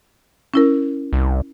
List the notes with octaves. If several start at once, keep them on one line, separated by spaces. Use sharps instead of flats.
C#4 E4 A#4
C2